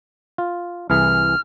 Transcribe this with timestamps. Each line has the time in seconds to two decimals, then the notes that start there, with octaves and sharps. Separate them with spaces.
0.38 F4
0.90 C2 E3 G#4 F6